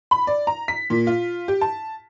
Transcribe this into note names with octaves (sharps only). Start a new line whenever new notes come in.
B5
D5
A#5
B6
A#2
F4
G4
A5